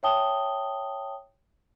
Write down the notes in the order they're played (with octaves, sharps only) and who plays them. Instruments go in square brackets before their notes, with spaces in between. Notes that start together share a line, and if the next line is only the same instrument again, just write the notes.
[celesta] C#5 E5 G5 A5 D#6 G7